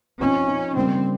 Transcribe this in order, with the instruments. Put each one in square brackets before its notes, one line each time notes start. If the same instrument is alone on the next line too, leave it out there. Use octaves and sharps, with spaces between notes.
[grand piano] F3 C4 D#4 [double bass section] C#4
[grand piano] F3 C4 D#4
[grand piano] C#3 G3 A#3 [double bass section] C4